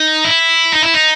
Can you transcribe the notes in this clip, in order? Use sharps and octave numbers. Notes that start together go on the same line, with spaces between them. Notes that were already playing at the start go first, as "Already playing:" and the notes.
Already playing: D#4
E4
D#4
E4
D#4